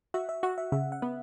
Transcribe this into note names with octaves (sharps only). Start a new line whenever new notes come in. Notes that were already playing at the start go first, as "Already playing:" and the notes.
F#4 E5
E5
F#4 F#5
E5
C#3 E5
F#5
B3